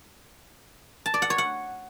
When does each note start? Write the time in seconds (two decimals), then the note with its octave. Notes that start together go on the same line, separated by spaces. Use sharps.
1.06 A5
1.14 D5
1.22 F#5
1.30 C#5
1.38 F#5